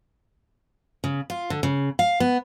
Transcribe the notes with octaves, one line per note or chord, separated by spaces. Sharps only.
C#3
F4
D3
C#3
F5
B3